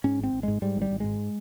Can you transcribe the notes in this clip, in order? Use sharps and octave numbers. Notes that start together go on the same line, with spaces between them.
G#2 C#4
G#1 C4
G#1
G#2 G#3
G#2 G3
G#1 G3
G#1
G#2 G#3